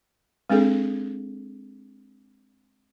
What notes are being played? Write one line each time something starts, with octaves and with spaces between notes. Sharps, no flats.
G#3 C4 D4 G#4 A4